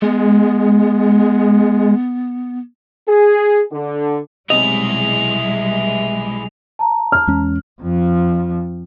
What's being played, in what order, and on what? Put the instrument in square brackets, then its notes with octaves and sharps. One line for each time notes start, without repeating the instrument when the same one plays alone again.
[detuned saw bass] G#3 [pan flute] B3
[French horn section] G#4
D3
[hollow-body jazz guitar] B1 C3 D#5 [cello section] G3 G#3 [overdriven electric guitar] E4 G#4 [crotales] F7
[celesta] A5 A#5
[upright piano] F6
[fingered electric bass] E2 G#3 C#4
[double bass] F2 F3